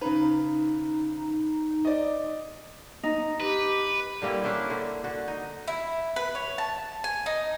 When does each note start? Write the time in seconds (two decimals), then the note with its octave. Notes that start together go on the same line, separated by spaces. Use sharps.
0.01 C#3 D#4 B4
1.85 D5 D#5
3.03 D#4
3.40 G4 B4
4.22 D3 G3 A#3 E4
4.44 C#4 D4 E4 C5
4.70 D3
5.04 D3 F#4
5.28 D#4
5.68 E4
6.16 B4
6.35 C#5
6.58 A5
7.04 G#5
7.26 D#4